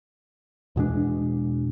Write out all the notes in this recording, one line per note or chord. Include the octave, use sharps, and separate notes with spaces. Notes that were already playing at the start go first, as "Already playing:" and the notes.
E2 B2 G#3 D4